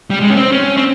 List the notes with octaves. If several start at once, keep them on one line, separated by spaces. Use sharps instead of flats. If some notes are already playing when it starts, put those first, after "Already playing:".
G3
G#3
C#4
C4
C#4
C4